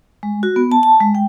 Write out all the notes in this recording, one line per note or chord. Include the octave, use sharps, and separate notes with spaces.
G#3
F#4
B3
A5
A5
G#3
G5